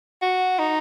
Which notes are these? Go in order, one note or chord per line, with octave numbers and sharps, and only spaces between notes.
F#4
D#4